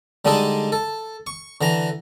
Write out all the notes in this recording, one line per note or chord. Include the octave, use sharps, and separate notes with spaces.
D3 G3 G#3 D4 D#4 A4
A4
C#6
D3 E3 A#5